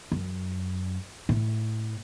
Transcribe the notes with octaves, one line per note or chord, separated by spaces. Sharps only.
F#2
A2